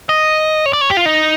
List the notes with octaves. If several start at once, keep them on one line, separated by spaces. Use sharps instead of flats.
D#5
C#5
D5
C#5
G4
F4
D#4